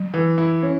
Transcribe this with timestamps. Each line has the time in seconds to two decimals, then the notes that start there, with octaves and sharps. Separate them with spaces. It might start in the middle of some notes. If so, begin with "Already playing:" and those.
Already playing: F#3
0.14 E3
0.38 E4
0.63 C#4